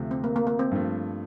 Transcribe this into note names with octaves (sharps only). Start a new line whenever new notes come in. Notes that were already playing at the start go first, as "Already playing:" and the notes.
Already playing: D2 C3 F3 A3
C4
A#3
A#3
A#3
C4
G2 F3 A3